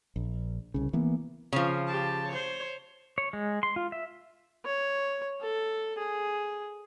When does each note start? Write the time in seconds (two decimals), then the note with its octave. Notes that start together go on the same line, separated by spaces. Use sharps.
0.16 A#1
0.74 C2 C#3
0.93 E3 A#3 B3
1.53 C#3 F3
1.87 G4 A5
2.28 C5 C#5
3.18 C#5
3.33 G#3
3.63 C6
3.76 F4
3.92 E5
4.65 C#5
5.41 A4
5.98 G#4